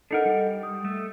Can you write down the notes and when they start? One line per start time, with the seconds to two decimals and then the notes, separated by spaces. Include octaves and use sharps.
0.11 D4 D#4 A4 A#4 D#5 F#5
0.25 G3
0.63 D#6
0.85 A3